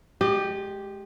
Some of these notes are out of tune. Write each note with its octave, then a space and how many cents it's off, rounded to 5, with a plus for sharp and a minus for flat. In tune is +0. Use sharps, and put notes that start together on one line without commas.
G#3 +30 G4 +0 D#5 -35